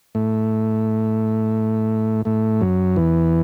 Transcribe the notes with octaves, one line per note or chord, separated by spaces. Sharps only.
A2 A3
A2 A3
F#2 F#3
E2 E3